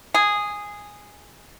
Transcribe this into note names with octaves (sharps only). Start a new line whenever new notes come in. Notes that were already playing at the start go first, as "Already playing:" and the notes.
G#4